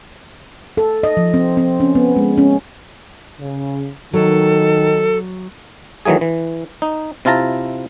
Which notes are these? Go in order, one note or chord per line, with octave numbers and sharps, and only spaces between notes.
A4
D#5
F3
C4
C4
C#4
B3
G#3
C#4
C#3
D#3 F#3 A4
D#3 E3 F#3 A3 G#4
E3
D#4
C3 E4 F4 A5 A#5